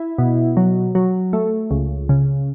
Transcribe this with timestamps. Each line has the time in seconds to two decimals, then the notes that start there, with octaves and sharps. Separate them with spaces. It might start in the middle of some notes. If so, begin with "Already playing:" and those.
Already playing: E4
0.18 B2
0.57 F#3
0.95 F#3
1.33 A3
1.71 C#2
2.09 C#3